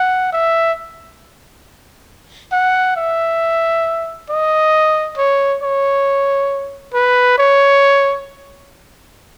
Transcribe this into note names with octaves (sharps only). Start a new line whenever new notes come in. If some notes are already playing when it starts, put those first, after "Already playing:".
Already playing: F#5
E5
F#5
E5
D#5
C#5
C#5
B4
C#5